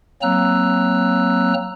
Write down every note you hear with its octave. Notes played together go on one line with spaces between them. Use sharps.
F#3 A#3 C4 A#5 E6 F#6